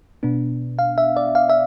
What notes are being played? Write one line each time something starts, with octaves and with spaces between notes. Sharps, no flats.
B2 B3 D4
F5
E5
D5
F5
E5